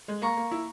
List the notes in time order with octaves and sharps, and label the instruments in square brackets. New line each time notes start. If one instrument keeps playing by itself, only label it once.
[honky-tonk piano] G#3
[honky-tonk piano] A#3 [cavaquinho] A#5 C#6
[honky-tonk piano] A#3
E4